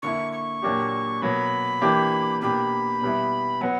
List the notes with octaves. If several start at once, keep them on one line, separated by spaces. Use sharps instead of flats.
D3 A#3 E4 C#6
C#6
A#2 F#3 A#3 D4 G4
B2 F#3 A#3 B5
E3 A#3 D4 G4
B2 A#3 D4 G4 B5
B2 G3 B3 E4
F#3 B3 F#5